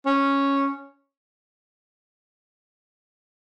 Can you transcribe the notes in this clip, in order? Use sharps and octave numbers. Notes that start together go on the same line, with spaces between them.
C#4